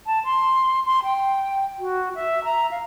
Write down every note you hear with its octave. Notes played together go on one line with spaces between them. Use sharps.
A5
C6
C6
G5
F#4
E5
A#5
F5